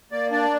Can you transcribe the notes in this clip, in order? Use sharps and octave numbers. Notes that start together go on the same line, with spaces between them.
A#3 D5
D4 D5